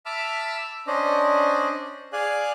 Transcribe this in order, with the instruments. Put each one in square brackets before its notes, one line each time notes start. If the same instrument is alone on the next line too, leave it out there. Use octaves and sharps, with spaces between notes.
[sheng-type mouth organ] E5 A5 B5 D6 E6 F6
C#4 D4 C5 D5 D#5
G#4 D5 F5 G#5 F#6